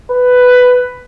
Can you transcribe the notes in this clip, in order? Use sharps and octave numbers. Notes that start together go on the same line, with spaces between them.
B4